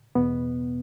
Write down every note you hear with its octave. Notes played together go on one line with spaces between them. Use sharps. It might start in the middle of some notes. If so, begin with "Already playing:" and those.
E2 B2 B3